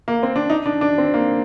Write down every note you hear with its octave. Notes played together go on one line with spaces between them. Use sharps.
A#3
C4
D4
D#4
D4
D4
C4
A#3